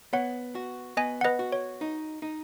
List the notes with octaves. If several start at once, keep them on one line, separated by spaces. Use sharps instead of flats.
B3 C#5 F#5
F#4
B3 D#5 G#5
F#5
B4 D#5
F#4
C#5
D#4
D#4